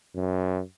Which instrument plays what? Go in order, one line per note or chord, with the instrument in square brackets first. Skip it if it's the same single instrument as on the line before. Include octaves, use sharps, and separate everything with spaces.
[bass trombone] F#2